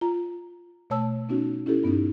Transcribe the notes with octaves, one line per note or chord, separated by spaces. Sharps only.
F4 A#5
B2 A3 C#5 A5 E6
B3 C#4 D#4 F#4
C#4 E4 G4 A4
G2 B3 C#4 D#4